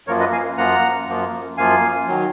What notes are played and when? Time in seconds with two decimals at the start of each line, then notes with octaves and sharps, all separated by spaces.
0.07 F#2 F3 A#3 F4 A#4 C#5
0.20 B4 D#5
0.32 F5 G#5
0.57 F#2 F3 A#3 F4 F#5 A#5
1.07 F#2 F3 A#3 F4
1.57 F#2 F3 A#3 F4 F5 G#5
2.08 D#3 F#3